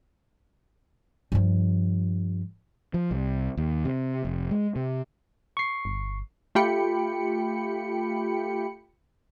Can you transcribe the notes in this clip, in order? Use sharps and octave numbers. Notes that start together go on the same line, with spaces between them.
G2 F3
F3
C2
D#2
C3
F1
G#3
C3
C#6 C7
G1
A3 F4 G4 G5 B5 C#7